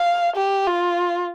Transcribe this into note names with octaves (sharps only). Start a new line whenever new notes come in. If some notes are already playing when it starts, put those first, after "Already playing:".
Already playing: F5
G4
F4